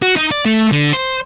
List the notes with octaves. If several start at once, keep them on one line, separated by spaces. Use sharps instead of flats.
F#4
D#4
D5
A3
D3
C5